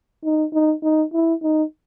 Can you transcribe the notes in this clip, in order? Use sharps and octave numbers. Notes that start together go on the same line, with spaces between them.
D#4
D#4
D#4
E4
D#4